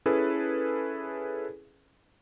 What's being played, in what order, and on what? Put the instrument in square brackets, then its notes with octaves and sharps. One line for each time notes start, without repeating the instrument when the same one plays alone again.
[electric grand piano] C#4 E4 G#4 A4 B4